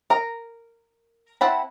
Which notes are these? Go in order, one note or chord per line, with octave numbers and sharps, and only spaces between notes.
A#4 A#5
C4 E4 F#5 A5 B5